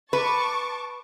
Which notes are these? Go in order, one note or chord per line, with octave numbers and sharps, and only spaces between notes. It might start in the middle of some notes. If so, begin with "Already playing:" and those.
B4 A5 C#6 D6